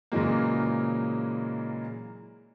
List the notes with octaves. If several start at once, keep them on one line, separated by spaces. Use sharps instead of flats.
A#2 C#3 E3 F#3 G#3 A#3